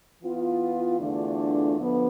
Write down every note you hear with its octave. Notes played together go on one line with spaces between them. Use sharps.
E3 B3 F4
E2 D3 A3 D4 F4
D3 F3 B3